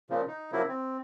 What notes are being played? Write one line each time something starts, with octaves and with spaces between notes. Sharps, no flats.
A#2 C#3 F3
D#4
C#3 F3 F#3 A#3 E4
C4